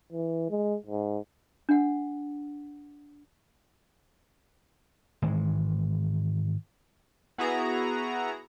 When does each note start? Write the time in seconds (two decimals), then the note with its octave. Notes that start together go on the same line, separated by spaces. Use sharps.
0.13 E3
0.50 G#3
0.86 G#2
1.69 D4 F#5
5.22 G#2 D#3 E3 G#3
7.38 B3 E4 F#4 G#4 A#5